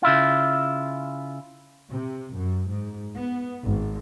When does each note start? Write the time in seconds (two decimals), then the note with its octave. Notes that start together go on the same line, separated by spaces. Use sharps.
0.03 C#3 E4 F4
1.92 C3
2.36 F#2
2.71 G#2
3.16 B3
3.64 G#1